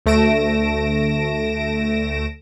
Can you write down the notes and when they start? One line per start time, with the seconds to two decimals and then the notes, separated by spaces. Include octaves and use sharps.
0.06 D2 A3 A#6 D7 E7